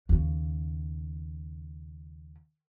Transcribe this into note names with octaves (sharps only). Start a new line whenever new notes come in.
D#2 C#3